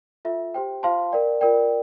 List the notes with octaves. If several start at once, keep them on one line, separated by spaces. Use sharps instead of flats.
F4 A4 E5
G4 C5 G5
F4 C5 F5 A5 C6
A#4 D5 G5
F4 A#4 D5 G5